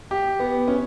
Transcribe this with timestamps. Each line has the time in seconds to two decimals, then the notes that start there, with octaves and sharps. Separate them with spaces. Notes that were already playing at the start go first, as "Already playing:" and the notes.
0.11 G4
0.40 B3
0.68 C#4